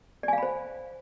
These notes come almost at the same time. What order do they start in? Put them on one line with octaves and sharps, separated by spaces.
D5 G#5 F5 B5 C5